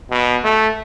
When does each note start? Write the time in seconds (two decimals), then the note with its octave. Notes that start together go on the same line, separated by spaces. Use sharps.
0.11 B2
0.44 A3